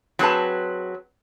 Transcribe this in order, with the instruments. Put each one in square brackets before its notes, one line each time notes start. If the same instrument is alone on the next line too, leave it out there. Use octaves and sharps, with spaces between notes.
[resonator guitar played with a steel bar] F#3 C4 G#4 B4 A5